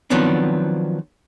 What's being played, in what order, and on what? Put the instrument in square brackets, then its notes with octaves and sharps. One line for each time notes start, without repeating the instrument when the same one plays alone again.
[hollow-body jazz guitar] D#3 F3 F#3 B3 C4 D4